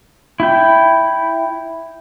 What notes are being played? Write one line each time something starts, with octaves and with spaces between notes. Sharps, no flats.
E4 G5